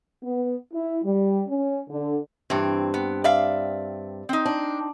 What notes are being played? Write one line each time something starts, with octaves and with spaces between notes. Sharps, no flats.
B3
E4
G3
C#4
D3
G2 E3 C4
B3
D5 E5 F5
C4 D#4
D4